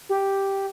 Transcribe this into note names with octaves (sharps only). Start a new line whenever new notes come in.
G4